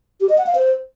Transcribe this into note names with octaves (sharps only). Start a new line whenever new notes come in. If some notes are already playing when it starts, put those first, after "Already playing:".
G4
D#5
F#5
F5
C5